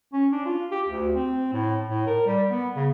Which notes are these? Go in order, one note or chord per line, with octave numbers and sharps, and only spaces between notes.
C#4
D4
F4
G4
D2
C4
A2
A2
A#4
G3
B3
C#3